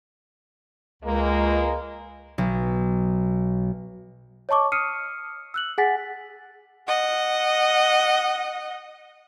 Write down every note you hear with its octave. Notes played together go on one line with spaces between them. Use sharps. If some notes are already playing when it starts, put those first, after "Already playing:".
C#2 G#3 A#3
B1
C#5 D#5 A5 C#6 D6
D#6 F6 C7 C#7 D#7
E6 F#6 F#7
G#4 F#5 G#5 A6 B6
D#5 F#5